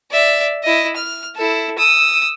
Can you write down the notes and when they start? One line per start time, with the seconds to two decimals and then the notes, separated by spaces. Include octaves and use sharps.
0.11 D5 E5
0.63 E4 D#5
0.96 F6
1.36 E4 A4
1.78 D#6 E6